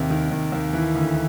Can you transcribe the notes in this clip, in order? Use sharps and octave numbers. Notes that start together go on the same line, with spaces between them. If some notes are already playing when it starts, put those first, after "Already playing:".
Already playing: D#2 C3
D#3
D#2
D#2
E3
D2